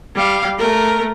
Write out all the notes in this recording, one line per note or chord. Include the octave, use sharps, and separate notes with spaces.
G3 F5
A3 A#4